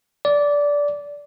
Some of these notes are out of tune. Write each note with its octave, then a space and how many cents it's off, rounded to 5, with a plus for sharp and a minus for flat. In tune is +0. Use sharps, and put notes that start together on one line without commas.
D5 -15